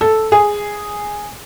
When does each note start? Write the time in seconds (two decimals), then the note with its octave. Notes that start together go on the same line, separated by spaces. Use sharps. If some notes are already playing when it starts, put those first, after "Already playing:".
0.01 A4
0.32 G#4